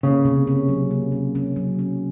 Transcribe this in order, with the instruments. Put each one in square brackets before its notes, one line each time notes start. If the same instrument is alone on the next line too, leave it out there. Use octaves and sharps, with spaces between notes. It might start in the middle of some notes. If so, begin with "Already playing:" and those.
[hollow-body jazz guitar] C#3 [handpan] A#3
[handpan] C3
C#4
F#3
A#3
C3
C#4
F#3
C#4